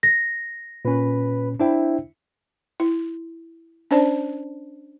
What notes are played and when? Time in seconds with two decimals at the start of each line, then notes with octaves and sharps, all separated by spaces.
0.03 A#6
0.85 A#2 C#4 B4
1.60 D4 E4 C5 G5
2.80 E4
3.91 C#4 D4 C5 D5 A5